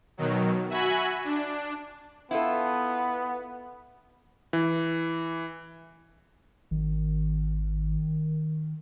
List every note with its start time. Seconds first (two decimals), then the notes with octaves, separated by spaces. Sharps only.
0.17 B2 D#3 F#3
0.69 F#4 E5 G#5 B5 F#6
1.24 D4
2.31 B3 E4 F4 A4
4.53 E3
6.71 G#1 D#3